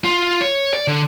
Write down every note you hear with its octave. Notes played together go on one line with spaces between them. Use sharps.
F4
C#5
D5
D3